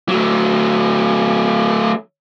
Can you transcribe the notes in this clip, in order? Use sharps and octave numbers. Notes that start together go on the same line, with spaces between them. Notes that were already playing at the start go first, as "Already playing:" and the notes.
F#3 A3